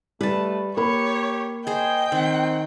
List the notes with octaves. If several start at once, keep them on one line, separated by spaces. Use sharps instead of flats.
G3 A3 B4 A5
A#3 G4 C#5 B5
G#4 C5 D#5 G5
D#3 C4